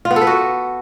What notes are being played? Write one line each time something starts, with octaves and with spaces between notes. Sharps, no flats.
F4
B3
A4
B4
F#4